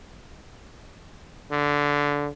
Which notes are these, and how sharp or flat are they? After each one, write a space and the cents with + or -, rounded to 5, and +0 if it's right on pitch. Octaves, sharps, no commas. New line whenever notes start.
D3 -15